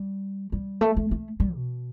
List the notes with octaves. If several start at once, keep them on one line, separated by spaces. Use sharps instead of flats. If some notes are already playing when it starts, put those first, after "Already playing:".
Already playing: G3
G3
A3
A3
A3
G3
B2